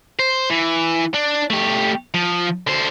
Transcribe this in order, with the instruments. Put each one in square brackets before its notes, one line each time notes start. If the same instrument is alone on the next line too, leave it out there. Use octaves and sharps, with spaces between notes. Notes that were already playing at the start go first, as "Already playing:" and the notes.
[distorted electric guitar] C5
E3
D4
A3 G4
F3
D3 C5